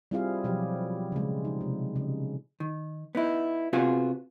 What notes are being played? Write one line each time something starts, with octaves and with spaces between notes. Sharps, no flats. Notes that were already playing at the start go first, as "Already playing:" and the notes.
G3 C4 E4 F4 G#4 F5
B2 F3 F#3 G4
C#3 G#3
D#4
C3
C#3
D#3
B3 D#4 E4
C3 B3 F4 F#4 G#4